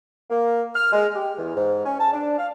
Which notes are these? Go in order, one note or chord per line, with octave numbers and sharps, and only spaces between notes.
A#3
F6
G#3
G4
E2
G#2
C#4
A5
D4
F5